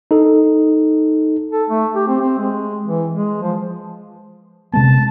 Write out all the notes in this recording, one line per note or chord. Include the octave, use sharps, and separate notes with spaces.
D#4 A4
A4
A3
G4
C4
C4
G#3
E3
G#3
F3
C3 G#3 B3 A5